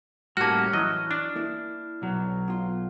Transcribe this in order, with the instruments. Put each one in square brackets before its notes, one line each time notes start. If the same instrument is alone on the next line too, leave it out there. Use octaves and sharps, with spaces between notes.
[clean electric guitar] A2 C#4 [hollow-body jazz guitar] G3 [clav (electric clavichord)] A#3 F#4 [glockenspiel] A5 F6
[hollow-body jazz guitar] E3 [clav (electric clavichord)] F#3 [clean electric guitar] D#5
[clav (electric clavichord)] D4
[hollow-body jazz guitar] A#3 E4
[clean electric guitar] B1 F#3
[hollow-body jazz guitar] B2 F4